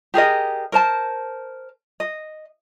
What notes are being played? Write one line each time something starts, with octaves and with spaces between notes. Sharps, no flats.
G4 G#4 A#4 D#5
A#4 C5 A5
D#5